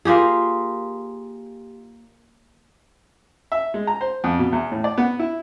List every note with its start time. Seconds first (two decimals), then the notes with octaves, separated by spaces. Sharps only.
0.05 A#3 F4 G4 G#4
3.52 E5
3.74 G#3
3.87 A#5
4.01 C5
4.24 F2
4.39 B2
4.53 E2
4.72 A2
4.84 D5
4.98 B3
5.19 E4